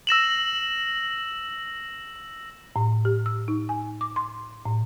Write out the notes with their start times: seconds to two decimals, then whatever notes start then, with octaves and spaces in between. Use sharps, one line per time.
0.07 E6 A#6 E7 F#7
2.76 A2
3.05 G4
3.26 E6
3.48 D#4
3.69 G#5
4.01 D6
4.16 C6
4.65 A2